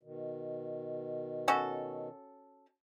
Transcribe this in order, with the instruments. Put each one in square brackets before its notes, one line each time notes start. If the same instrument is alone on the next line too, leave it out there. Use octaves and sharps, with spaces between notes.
[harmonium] B2 D#3
[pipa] C#4 F#4 A4